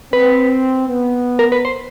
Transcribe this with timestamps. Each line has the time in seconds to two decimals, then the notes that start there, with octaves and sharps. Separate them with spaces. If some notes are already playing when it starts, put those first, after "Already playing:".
0.13 C4 B4
0.89 B3
1.39 A#4
1.52 B4
1.65 C5